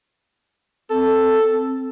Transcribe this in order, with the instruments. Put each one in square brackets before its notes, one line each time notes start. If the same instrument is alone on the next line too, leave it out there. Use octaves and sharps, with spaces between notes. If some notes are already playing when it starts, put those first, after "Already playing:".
[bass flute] C4 [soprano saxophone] A4